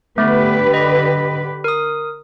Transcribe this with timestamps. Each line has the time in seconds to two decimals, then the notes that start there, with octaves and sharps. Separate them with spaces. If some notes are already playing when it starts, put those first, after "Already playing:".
0.18 D3 A3 B3 G4 B4
0.74 D#5
1.64 A#4 D#6